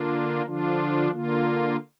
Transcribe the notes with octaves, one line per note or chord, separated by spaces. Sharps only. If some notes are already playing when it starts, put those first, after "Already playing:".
Already playing: D3 A#3 D4 F4
D3 F3 D4 F4
D3 A#3 F4